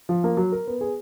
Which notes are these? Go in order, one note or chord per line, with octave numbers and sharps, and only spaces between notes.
F3
A#3
F#3
A#4
B3
G#4